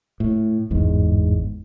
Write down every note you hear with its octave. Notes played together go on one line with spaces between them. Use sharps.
A2
G1 E2 G#2